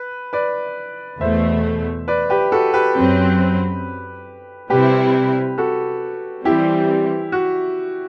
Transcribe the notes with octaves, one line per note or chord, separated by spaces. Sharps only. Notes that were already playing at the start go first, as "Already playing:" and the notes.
Already playing: B4
B4 D5
E2 B2 A3 C5 E5
B4 D5
G4 B4
F#4 A4
G4 B4
F#2 F#3 C4
C3 G3 C4 E4 G4 B4
F#4 A4
E3 G3 C4 E4 G4
F#4